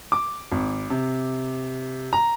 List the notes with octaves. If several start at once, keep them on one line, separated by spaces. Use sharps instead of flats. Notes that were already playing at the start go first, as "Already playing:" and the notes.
D6
G#1
C3
A#5